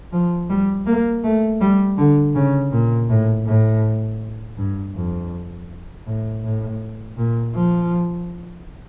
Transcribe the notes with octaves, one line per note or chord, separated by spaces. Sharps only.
F3
G3
A#3
A3
G3
D3
C#3
A#2
A2
A2
G2
F2
A2
A2
A#2
F3